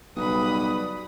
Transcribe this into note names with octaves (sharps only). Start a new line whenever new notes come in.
B1 C#3 G3 B4 B5 D#6